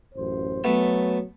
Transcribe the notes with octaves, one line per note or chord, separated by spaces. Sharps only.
A1 F#2 C5
F#3 A3 B3 A5